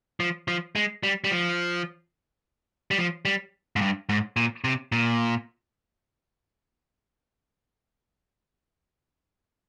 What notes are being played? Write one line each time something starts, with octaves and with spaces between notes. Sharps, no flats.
F3
F3
G#3
G3
G3
F3
G3
F3
G3
G#2
G2
G#2
A#2
C3
A#2